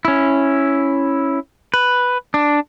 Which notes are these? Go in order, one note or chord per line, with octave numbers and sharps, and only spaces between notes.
C#4 E4
B4
D4